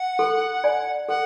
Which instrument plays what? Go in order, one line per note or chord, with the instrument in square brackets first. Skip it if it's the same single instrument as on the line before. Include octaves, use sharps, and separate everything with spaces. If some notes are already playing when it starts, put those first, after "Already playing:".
Already playing: [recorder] F#5
[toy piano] A4
D5 G#5
[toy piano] A4 [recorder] F#5